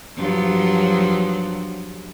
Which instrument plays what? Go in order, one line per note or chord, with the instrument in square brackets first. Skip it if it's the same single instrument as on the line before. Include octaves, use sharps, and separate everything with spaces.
[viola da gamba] G2 F3 F#3